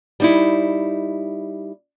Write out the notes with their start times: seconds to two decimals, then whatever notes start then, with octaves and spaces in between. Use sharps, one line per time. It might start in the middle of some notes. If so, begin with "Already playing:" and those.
0.20 G3 D#4 E4